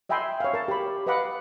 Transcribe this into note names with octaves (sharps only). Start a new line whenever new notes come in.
D#5 E5 G5 G#5 B5 C6
C#5 F5
A#4 A5
G4 B5
B4 D#5 F5 F#5 B5 D6